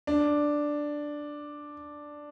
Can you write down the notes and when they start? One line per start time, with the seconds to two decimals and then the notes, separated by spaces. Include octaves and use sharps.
0.07 D4